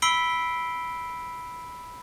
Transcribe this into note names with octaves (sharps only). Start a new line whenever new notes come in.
B5 E6 B6 C7 D7 G7